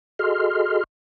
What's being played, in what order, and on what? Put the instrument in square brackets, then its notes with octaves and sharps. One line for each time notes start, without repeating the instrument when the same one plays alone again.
[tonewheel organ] F#4 G#4 A4 D#5 C6 F6